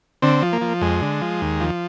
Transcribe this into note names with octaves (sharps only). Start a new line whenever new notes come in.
D3 C4
F3
A#3
F3
F2 G#3
D3
F3
D#2
F3